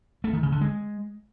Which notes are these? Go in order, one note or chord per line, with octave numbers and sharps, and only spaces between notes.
A3
D#3
C#3
D3
G#3